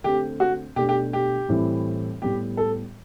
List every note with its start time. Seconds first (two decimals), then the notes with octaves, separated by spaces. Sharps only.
0.04 D3 A3 C4 G4
0.40 F#4
0.76 B2 A3 D4 G4
0.89 G4
1.13 G4
1.49 A2 E3 G3 C4 E4
2.22 A2 G3 B3 G4
2.57 A4